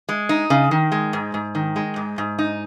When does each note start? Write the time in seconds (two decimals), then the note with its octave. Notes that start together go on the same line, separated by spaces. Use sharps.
0.09 G#3
0.29 D#4
0.50 C#3
0.71 D#3
0.92 G#3
1.13 G#2
1.34 G#2
1.55 D#3
1.76 G#3
1.96 G#2
2.18 G#2
2.39 D#4